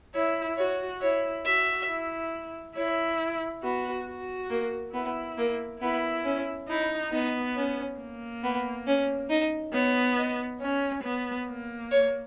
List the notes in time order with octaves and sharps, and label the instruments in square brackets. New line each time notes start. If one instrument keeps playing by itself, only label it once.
[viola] E4 [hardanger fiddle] C#5
[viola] F#4 [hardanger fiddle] C#5
[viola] E4 [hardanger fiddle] C#5
[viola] F#4 [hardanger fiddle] E5
[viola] E4
[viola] E4 [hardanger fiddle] C#5
[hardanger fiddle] B3 [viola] F#4
[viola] F#4
[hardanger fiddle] A#3
[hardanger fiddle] B3 [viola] E4
[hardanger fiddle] A#3
[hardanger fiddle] B3 [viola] E4
[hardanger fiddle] C#4
[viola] D#4 [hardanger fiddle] E4
[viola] B3 [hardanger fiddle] D#4
[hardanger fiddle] C#4
[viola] A#3
[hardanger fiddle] B3
C#4
D#4
[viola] B3 [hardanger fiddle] C#5
[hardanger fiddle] D#5
[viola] C#4 [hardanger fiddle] C#5
[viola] B3
A#3
[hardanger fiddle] C#5